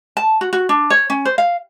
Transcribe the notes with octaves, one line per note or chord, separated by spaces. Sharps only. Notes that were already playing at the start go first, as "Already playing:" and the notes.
A5
F#4
F#4
D4
C#5
C#4
C5
F5